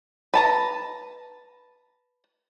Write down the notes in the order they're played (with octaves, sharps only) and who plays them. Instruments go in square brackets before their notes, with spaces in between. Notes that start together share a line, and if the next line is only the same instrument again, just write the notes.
[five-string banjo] B4 A5 A#5